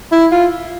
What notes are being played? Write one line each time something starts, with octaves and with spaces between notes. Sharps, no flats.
E4
F4